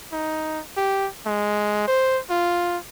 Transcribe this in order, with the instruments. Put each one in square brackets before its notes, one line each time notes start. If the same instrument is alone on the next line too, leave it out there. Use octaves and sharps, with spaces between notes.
[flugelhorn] D#4
G4
G#3
C5
F4